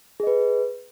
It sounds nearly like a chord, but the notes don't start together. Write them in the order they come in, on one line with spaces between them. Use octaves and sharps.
G#4 D#5 B4